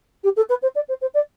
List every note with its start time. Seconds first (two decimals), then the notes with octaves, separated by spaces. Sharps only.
0.23 G4
0.36 A4
0.49 B4
0.62 C5
0.75 D5
0.88 C5
1.01 C5
1.14 D5